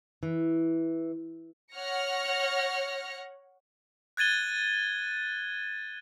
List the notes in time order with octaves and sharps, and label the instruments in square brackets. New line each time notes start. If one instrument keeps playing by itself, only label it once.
[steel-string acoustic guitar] E3
[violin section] C#5 F#5 F6 A#6 C#7
[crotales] F#6 G#6 A6 D#7 G7